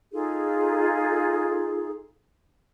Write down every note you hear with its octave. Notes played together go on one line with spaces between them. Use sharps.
D#4 F4 G#4 A4